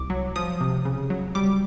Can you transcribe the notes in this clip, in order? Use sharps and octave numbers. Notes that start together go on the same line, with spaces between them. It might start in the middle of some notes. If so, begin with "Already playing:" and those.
Already playing: C2 D6
F#3
F3 D#6
C3
C#3
F#3
G3 D6